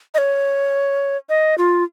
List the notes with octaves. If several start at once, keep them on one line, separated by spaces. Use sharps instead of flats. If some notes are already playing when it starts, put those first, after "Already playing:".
D#5
C#5
D#5
F4